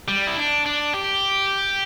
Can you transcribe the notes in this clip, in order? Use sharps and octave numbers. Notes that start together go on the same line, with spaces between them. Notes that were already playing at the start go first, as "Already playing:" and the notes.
G3
E4
D4
D4
G4